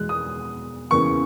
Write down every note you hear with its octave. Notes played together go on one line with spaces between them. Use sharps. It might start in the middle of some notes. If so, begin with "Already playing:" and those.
Already playing: E2 B2 G#3 F#6
D#6
E2 C#3 E3 A#3 C#6